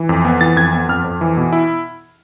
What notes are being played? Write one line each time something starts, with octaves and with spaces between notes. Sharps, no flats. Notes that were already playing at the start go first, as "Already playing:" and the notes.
Already playing: E3
F2
B3
E3 A6
F2 G#6
B3
F2 F6
F2
E3
B2
E4